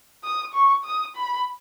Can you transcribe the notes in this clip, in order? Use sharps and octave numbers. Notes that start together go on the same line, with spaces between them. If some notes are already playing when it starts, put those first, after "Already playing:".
D#6
C#6
D#6
B5